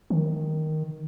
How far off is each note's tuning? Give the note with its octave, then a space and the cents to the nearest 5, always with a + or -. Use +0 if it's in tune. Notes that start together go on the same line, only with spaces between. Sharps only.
D#3 +0